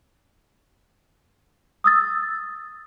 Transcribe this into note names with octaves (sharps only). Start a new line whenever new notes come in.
D#6 E6 A6